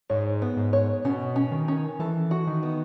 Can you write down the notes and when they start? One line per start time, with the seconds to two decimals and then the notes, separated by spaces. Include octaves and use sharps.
0.10 G#2 C#5
0.42 B3
0.57 G#2
0.73 C#5
1.05 B2 C#4
1.36 C#4
1.51 D#3
1.68 C#4
1.99 E3 A4
2.31 F#4
2.47 D#3
2.63 B3